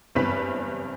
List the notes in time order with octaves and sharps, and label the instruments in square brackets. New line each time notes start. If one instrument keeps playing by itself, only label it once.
[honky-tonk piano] F#1 E2 G2 C4 B4 B6